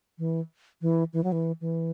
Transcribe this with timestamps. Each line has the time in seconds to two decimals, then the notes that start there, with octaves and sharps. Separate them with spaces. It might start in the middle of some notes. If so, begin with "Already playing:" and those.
0.18 E3
0.82 E3
1.13 E3
1.24 F#3
1.32 E3
1.61 E3